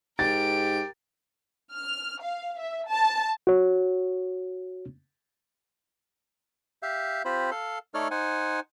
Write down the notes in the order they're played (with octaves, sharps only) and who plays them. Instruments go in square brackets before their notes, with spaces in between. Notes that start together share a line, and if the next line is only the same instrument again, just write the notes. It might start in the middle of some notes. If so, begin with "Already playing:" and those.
[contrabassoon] G#2 [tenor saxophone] G4 [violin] A#4 D7 [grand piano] A6
[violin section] F6
F5
E5
A5
[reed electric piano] F#4 C#5
[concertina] G4 E5 F5
C4 F4 G4 C5 B5
A4 F5
A3 D#4 A4 C#5 D5 F6
D#4 C5 F#5 G#5